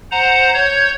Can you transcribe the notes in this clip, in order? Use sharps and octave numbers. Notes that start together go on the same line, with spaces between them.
C5 F#5 A#5
C#5 G6